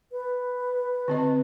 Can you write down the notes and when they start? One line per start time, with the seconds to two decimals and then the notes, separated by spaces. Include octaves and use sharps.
0.12 B4
1.08 D3 C4 D#5